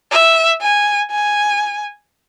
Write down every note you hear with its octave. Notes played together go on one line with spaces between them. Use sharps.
E5
G#5
G#5